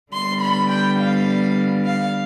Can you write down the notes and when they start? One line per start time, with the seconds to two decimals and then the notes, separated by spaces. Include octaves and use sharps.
0.13 D3 G3 B3 C6
0.41 B5
0.70 G5
0.99 F5
1.86 F5